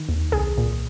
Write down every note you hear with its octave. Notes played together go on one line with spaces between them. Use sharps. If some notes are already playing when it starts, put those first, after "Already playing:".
Already playing: D#3
D#2
C2 G#4
A#2